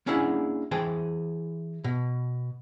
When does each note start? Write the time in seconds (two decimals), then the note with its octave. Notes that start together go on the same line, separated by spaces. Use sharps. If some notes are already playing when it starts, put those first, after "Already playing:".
0.06 A#3 C#4 D4 E4 G#4 F#5
0.71 E3 G#4 C5 G5 A5
1.84 B2